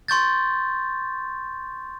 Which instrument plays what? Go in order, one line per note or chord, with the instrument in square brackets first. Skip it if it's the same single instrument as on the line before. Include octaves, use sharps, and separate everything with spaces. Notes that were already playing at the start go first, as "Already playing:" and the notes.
[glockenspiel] C6 C#6 G6 A6